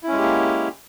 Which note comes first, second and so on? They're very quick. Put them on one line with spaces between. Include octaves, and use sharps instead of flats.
E4 C#4 G#3 G4 A#3